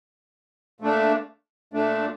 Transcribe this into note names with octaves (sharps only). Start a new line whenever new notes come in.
A#2 A3 D4
A#2 A3 D4